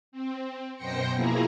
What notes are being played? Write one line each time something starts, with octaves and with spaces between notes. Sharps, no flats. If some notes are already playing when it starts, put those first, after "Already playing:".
C4
F#2 B2 C5 G5 A#6 C#7
B2 F3 A#3 E4 G#4 A#4